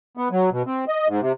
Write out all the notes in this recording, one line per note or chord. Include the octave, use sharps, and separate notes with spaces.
B3
F#3
B2
C4
D#5
G#2
C3